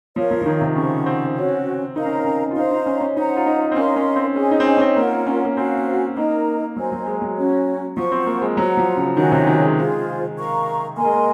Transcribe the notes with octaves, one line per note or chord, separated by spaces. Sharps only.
F3 A#4 C#5 F5
F3
F3
D#3
C3
C#3 C5 F#5 C#6
C4
C#4 F#4 C#5
D#4 A#4 F5 A#5
C#4
C4
C#4
F4
D#4 C5 F5 A#5
D#4
C#4
C#4
D#4 C5 F#5 A#5
F4
D#4
C4
C#4 D#4 A#4 F5 C6
C#4
C4
C#4 G#4 D#5 G#5
D#4
C4
C#4
C#4
C4
A#3 F4 A#4 C#5 F#5
C#4
A#3
C4 F#4 C5 F5 G#5
A#3 D#4 A#4 D#5 A#5
F#3 C5 D#5 G#5
F#3
G#3
F#3
C#4 F#4 C#5
F3 C5 F#5 C#6
C4
A#3
G#3
F#3 C5 F#5 A#5
F3
C#3
D#3 F#4 C#5 G#5
C3
D#3
G#3
F4 G#4 C5
A#4 F5 A#5 C#6
A#3 A#4 D#5 G#5 C6
G#3
A#3